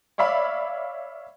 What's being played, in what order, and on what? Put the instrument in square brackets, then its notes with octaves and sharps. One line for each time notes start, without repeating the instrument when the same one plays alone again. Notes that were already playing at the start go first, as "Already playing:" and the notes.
[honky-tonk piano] C#5 D5 E5 F5 B5